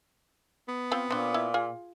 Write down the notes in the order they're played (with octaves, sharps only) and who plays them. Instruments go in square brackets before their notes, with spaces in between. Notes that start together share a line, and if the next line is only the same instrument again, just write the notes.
[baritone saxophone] B3
[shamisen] C4 F4 F5
[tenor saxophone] A#2 [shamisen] C4 D4
[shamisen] E4
F4 G#4